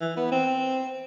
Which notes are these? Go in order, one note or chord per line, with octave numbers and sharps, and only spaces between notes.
E3
B3
C4